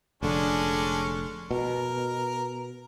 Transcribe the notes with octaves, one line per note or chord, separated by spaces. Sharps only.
F1 D3 G#3 C#4 D4
B2 A#4